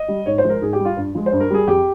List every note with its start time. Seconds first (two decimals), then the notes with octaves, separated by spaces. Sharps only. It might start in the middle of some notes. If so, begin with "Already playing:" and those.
Already playing: D#5
0.08 G3
0.26 G#2 C#5
0.38 C5
0.43 F3 G#3
0.50 A#4
0.61 G#2 G#4
0.73 G4
0.79 G3
0.85 F4
0.97 G2
1.15 F3 G#3
1.26 C5
1.32 G2
1.40 A#4
1.50 G3 G#4
1.67 F2 G4